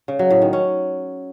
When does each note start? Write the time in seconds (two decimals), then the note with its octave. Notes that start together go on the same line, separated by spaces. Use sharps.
0.08 C#3
0.19 F#3
0.31 A2
0.42 D#3
0.53 C#4